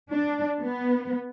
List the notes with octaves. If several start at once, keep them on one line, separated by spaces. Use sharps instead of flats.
D4
B3